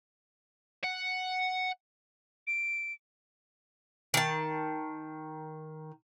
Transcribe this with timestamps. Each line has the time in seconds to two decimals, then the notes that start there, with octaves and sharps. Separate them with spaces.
0.84 F#5
2.47 D7
4.14 D#3 A5